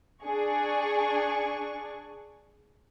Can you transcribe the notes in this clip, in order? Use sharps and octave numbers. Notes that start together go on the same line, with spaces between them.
D4 G#4 C#6